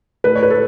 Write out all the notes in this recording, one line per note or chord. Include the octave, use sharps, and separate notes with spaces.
A2 B4
C#5
B4
A4